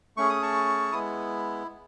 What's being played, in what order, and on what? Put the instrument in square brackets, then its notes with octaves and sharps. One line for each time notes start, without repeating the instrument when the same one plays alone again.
[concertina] A3 C#4 G#4 C#6
D#6
A5 C#6
G#3 B3 E4 D#6